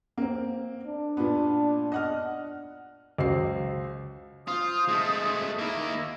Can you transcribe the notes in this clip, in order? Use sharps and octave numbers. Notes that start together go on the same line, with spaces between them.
A#3 C4
D4
A#2 B3
D#5 F#5 F6
C#2 F#3 C5 C7
F4 C5 D#6
G#3 A3
A#3 D#4 E4